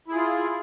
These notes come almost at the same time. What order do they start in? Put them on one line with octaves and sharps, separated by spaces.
E4 G#4 F4